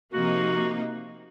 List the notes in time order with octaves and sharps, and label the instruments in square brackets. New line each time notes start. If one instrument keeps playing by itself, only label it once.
[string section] C3 F3 A#3 D#4 [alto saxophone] F#4